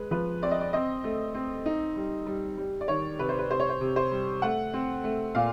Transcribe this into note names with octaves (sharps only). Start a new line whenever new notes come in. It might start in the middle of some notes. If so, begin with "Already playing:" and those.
Already playing: G#3 B4
F3 B4
C4 D5
D#5
D5
C4 D#5
A3
C4
D#4
G3
G3
G3
D5
D#3 C#5
C3 B4
C5
B4
C3 C5
C#5
C5
C3
C5
G3
A3 F#5
C4
A3
A#2 F5